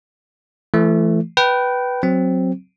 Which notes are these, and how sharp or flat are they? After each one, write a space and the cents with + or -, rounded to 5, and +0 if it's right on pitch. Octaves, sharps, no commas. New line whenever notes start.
E3 +35 A3 +0
B4 +0 G5 -20
F#3 +0 C4 +0